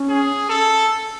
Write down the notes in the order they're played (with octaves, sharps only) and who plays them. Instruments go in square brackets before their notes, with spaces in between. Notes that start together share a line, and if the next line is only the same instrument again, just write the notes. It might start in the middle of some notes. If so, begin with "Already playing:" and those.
Already playing: [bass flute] C#4
[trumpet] G#4
A4